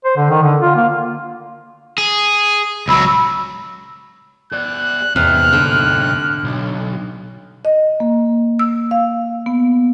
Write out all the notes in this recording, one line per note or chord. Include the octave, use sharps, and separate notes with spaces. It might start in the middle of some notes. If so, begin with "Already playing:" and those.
C5
D3
D#3
D3
F4
A#3
G#4
C#2 F#3 B5 E6
G#4 D5 F#6
E2 G#2 C3 F6 F#6
D3
B1
D#5
A#3
E6
F5
B3